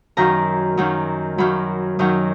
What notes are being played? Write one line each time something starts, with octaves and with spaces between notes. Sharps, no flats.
F#2 D#3 F#3 A#5
F#2 D#3 F#3
F#2 D#3 F#3 B5
F#2 D#3 F#3